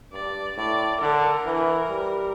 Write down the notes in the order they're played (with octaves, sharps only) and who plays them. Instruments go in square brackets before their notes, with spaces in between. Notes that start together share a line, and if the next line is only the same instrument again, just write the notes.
[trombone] G2 [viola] D5
[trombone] A2 [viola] D5
[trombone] D3 [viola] A#4
[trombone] E3
G3